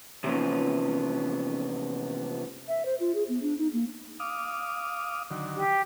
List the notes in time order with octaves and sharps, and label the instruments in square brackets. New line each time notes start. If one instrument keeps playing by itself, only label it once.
[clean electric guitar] C3 E3 F3 A#3 B3 C#4
[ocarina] E5
C5
F4
G#4
B3
D4
D#4
A#3
[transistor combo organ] F5 D6 D#6
D3 D#3 F#3
[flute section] G4